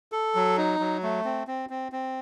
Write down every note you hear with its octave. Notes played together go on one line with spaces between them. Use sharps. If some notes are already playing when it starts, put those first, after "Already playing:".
A4
F#3
D#4
F#3
A3
C4
C4
C4
C4